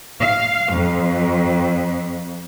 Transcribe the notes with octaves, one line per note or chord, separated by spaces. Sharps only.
F5
F2